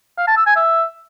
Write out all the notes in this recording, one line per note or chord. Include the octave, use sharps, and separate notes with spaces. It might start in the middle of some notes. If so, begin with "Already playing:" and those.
F5
A5
E6
G#5
E5